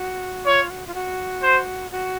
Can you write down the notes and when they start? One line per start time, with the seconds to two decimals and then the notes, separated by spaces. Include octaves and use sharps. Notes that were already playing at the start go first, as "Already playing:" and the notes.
Already playing: F#4
0.46 F4 C#5
0.70 F#4
0.87 F4
0.94 F#4
1.43 C5
1.91 F#4